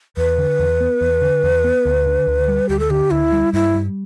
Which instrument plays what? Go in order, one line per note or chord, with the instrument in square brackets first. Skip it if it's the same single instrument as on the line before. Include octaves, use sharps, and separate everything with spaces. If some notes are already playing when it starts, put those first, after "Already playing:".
[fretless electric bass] E2 [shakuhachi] B4
[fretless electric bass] D3
E2
B3
E2
D3
E2
B3
D2
D3
D2
G3
[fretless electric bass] D2 [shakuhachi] G4
[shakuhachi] A4
[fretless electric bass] D3 [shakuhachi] G4
[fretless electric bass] D2 [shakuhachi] E4
[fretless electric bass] G3
[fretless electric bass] G2 [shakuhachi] E4
[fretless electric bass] G3